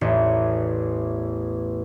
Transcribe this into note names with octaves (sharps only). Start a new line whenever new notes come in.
A1 E2